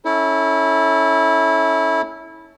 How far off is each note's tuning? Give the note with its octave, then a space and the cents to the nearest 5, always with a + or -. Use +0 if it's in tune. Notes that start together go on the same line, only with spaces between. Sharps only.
C#4 +0 E4 -20 A4 +0